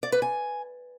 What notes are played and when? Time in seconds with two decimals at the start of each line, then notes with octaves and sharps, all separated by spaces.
0.03 D5
0.12 B4
0.22 G#5